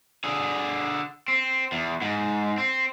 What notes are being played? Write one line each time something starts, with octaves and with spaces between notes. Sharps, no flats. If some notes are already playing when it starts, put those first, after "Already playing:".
D3 G#4
C4
E2
G#2
C4